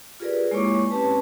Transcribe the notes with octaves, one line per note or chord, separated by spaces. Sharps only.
F4 G4 G#4 A#4 B4 D5
G#3 A#3 E4 C#5 C#6 D6
C4 C#4 G4 B4 A5